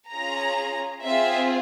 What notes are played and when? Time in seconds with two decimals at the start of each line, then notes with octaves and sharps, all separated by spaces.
0.13 C#4 F4 G#4 A#5
1.05 C4 F4 G#4 E5